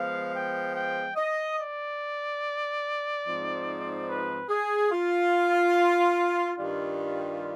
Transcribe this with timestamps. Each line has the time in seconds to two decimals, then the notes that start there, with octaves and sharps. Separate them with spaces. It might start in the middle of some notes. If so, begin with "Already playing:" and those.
Already playing: F3 G#3 B3 F5
0.34 G5
0.74 G5
1.16 D#5
1.57 D5
3.23 G#2 F3 C4 D#4
4.07 B4
4.49 G#4
4.91 F4
6.56 G2 D#3 G3 D4 F4